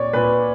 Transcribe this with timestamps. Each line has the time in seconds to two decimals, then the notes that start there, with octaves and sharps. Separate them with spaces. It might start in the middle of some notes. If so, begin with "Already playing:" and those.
Already playing: A#2 C#5 D5
0.13 A#2 B4